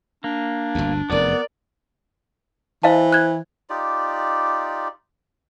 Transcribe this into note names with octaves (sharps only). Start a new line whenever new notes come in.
A#3 D4
G1 D2
F1 E2 B3 A#4 D5
E3 C5 D#5 F5 A5
F#6 G#6
D#4 F4 G4 D5